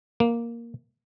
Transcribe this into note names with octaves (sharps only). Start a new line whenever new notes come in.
A#3